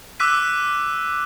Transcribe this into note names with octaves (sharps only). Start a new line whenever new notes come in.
D6 E6 F#6 B6 D#7